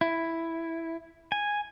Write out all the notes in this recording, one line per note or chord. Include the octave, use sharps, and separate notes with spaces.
E4
G#5